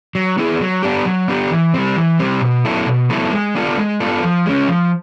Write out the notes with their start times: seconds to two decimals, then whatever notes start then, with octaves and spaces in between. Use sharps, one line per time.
0.15 F#3
0.38 B3 E4 G#4
0.61 F#3
0.83 B3 D4 G4
1.06 F#3
1.28 B3 D4 G4
1.50 E3
1.74 G3 C4
1.96 E3
2.19 G3 C4
2.41 B2
2.65 F#3 B3 E4 A4
2.87 B2
3.10 F#3 B3 E4 A4
3.32 G#3
3.55 B3 D4 F4 A4
3.78 G#3
4.00 B3 D4 F4 A4
4.23 F3
4.46 G#3 C#4
4.68 F3